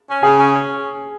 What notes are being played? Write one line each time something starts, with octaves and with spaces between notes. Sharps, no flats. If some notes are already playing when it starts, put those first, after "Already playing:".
C#4
C#3 G#4
C#4
C#4